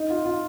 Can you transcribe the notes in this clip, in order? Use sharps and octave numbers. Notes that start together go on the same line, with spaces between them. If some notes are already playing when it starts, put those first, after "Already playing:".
Already playing: D#4
F4
F4